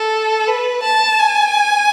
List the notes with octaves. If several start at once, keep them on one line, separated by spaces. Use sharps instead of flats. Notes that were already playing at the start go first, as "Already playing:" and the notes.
Already playing: A4
B4
A5
G#5